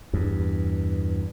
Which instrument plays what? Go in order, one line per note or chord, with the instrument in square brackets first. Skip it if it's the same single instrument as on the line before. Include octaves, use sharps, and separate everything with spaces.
[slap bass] E2 G2